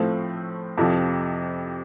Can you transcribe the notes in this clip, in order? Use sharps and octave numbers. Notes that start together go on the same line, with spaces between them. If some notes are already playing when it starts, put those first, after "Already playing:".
Already playing: A2 F3 A3 C4
F2 C3 F3